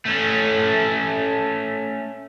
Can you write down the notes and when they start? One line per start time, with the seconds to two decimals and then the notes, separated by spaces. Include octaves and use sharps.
0.05 A3 C#4